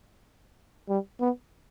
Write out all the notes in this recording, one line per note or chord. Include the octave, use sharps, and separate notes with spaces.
G3
B3